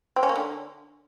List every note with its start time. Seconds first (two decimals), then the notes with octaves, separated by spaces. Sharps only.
0.16 C4
0.23 C#4
0.29 A#3
0.36 D3